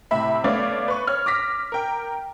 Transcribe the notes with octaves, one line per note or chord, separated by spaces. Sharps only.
A2 C3 E5 B5
A3 B3 C#5 D5 F5
B4 C#6
C#5 F6
D6 A#6 B6
A#4 G5